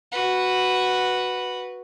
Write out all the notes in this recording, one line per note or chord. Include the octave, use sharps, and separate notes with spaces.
F#4 B4